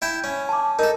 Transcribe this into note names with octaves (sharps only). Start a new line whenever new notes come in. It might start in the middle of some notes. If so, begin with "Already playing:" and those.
E4 G5 A5
C#4
A5 D6
D#4 A4 A#4